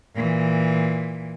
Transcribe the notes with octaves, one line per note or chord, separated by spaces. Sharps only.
A#2 E3